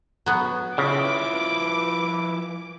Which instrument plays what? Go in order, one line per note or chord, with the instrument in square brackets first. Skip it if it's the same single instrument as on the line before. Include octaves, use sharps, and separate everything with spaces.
[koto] F#3 B3
[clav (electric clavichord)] C#3 [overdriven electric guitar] F3 E4 [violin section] B4 D6